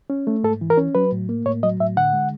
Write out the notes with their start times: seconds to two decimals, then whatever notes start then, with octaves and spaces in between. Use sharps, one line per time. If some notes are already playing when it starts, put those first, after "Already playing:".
0.10 C#4
0.27 A3
0.44 G#2 A4
0.61 E3
0.70 A#4
0.77 C#4
0.95 F#3 B4
1.12 A2
1.29 A#3
1.45 A2 C#5
1.63 F#3 D#5
1.80 A2 E5
1.96 D3 F#5
2.13 G#3